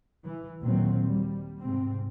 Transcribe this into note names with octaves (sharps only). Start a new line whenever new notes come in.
E3
D#2 A#2 D#3 F#3 C4
G3
G#2 C3 C4